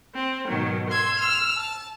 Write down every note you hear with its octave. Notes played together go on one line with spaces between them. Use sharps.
C4
G#2 B2 D#3 F#3
C6 E6 G#6
E6 F6
A5